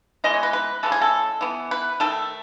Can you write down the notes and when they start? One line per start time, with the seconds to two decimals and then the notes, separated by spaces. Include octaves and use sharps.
0.24 E3 G#3 B3 D#5
0.34 C#5
0.43 B4
0.53 B4
0.83 C#3 E3 G#3 A4
0.92 G#4
1.02 A4
1.41 E3 B3
1.71 B4
2.00 D#3 A3 A4